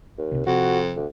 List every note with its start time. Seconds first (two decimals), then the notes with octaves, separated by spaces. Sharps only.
0.18 D#2
0.32 C2 C3
0.47 F2 C3 F#4
0.96 D2